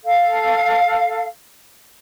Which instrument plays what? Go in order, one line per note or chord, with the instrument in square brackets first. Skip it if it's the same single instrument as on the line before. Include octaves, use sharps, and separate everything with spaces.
[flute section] A4 F5